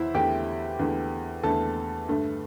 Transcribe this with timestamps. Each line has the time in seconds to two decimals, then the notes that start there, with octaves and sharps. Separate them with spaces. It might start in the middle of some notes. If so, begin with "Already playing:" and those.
Already playing: E2 E4 C5 E5
0.14 E2 D3 A3 G4 G5
0.79 E2 D3 A3
1.43 E2 D3 A3 A4 A5
2.08 G2 D3 A3